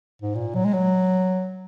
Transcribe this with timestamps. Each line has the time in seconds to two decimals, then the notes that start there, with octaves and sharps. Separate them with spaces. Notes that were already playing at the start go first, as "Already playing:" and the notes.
0.22 G#2
0.35 A#2
0.55 F#3
0.65 G#3
0.74 F#3